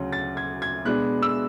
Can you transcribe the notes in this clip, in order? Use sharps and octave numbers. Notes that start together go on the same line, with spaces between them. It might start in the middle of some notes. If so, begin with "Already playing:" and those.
Already playing: D2 C#3 F#3
A6
G#6
G#6
B2 G#3 B3 D4 F#6
E6